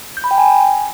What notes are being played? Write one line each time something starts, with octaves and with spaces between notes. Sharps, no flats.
G6
B5
G5
G#5